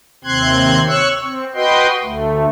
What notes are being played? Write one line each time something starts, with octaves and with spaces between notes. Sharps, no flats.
D#2 C3 C4 C6 F#6 G#6
C#5 C#6 E6 F#6
C4
F#4 B4 D#5 G5 C6
D2 A3